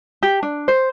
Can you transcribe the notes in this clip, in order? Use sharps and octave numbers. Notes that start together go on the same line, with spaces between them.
G4
D4
C5